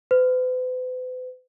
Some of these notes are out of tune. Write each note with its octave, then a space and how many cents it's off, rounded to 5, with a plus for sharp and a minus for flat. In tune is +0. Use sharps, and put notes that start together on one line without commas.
B4 +45